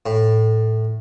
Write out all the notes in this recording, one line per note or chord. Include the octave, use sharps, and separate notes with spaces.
A2